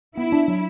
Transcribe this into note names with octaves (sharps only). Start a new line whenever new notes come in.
B3 E4
D4
F#3